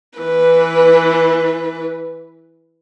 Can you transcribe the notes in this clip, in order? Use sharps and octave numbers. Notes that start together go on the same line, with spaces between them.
E3 B4